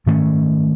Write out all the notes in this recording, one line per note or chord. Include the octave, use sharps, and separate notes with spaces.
G#2 D#3 A3 C#4